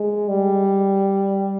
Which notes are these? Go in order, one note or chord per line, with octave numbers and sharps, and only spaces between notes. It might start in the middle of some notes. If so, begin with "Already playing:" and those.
Already playing: G#3
G3